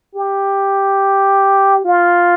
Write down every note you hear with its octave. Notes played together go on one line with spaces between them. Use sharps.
G4
F4